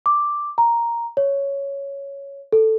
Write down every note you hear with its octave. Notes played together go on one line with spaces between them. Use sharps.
D6
A#5
C#5
A4